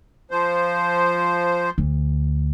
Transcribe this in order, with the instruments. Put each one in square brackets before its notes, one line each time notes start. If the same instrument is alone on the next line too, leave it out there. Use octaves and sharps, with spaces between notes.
[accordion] F3 C5
[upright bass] D2